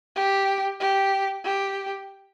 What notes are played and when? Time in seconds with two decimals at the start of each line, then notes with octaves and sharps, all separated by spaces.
0.16 G4
0.80 G4
1.44 G4